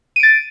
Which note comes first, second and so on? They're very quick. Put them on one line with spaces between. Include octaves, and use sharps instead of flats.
D#7 D7 A6